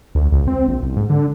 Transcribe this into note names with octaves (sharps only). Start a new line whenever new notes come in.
D2
C#2
C4
A#1
C2
G#2
D3